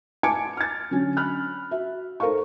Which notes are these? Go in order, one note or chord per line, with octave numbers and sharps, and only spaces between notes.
G#5 A5 D6 G#6 C#7 D7
F6 A6
D3 F#3 C#4
B5 F6 F#6
F#4 E5
D#4 A4 A#4 C5 F5 C#6